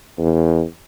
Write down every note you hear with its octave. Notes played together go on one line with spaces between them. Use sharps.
E2